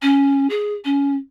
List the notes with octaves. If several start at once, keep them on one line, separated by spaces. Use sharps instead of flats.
C#4
G#4
C#4